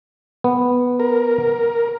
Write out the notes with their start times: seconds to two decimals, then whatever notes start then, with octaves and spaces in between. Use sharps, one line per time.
0.44 B3
1.00 A#4